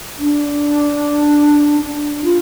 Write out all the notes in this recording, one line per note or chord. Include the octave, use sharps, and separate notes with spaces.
D4
D4
F4